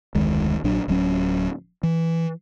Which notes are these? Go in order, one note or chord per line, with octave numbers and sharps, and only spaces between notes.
F1 D2 D#3 G#3
A#1 A#2 F#3 D4
D1 F#3 C#4
E3